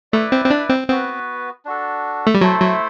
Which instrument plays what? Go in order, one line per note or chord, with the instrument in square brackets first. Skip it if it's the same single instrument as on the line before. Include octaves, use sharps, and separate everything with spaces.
[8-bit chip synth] A3 [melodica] E4 B4 D5
[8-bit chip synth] C4
C4
D4
C4
[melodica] B3 F#4 B4 [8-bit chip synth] C4
[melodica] D4 F#4 A4
[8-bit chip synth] A3
G3
[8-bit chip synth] F#3 [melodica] A3 E4 A4 C5
[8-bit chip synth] F#3